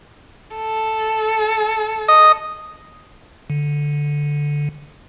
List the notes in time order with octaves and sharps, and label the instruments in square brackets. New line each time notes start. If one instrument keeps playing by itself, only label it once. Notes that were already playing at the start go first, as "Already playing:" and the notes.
[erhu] A4
[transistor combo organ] D#5
[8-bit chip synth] D3